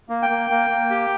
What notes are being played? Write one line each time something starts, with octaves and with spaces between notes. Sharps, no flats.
A#3
G5
A#3
A#3
A#3
G4